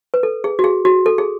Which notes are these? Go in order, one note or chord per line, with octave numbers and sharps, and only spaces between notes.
B4
A4
G#4
F#4
G#4
F#4
A4
G#4